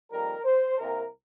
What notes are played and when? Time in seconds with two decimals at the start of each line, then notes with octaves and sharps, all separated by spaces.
0.11 F2 D#3 G3 A#3 A#4
0.45 C5
0.78 C2 C3 G3 A#3 A#4